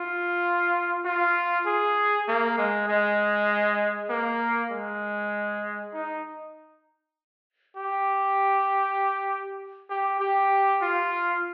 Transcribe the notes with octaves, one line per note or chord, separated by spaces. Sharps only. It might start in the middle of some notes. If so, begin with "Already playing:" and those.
Already playing: F4
F4
G#4
A#3
G#3
G#3
A#3
G#3
D#4
G4
G4
G4
F4